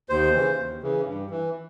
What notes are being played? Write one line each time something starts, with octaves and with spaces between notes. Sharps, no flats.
D#2 C5
C#3 E3
D#2
C#3 E3
G2
E3